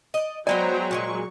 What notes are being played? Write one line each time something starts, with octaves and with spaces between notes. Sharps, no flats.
D5 D#5
F#3 G#3 B3 C5 D5 G5 G#5 A#5
A#2 D#3 G#3 C#6